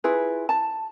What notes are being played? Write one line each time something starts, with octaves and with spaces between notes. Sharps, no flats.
E4 F4 G#4 B4
A5